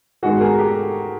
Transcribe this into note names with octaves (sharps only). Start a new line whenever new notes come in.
G#2 D#3 G#3 B3 F#4 G#4
G#4 A#4
G4 A4